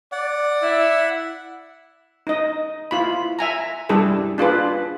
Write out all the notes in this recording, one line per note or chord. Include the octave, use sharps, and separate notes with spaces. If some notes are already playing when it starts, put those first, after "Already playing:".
D5 F#5
E4 E5
D#4 D#5
E4 F4 B5
E5 G#5 A#5
G3 D4 E4 G#4 A4
D4 F4 G#4 B4